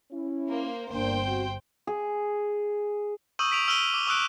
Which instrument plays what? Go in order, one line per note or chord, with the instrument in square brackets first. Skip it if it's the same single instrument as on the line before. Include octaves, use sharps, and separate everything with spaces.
[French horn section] C#4 E4
[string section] A#3 C5
[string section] G1 C5 G5 [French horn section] A#3 D4
[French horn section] C4 F#4
[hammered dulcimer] G#4
[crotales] C#6 D#6 E6 G6 D#7 F#7
B6 D7 F7
E6 F6 D#7 G7
D6
C#6 D#6 E6 F#6 D7